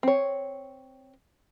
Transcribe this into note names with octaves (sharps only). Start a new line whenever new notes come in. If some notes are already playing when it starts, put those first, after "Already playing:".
C4 C#5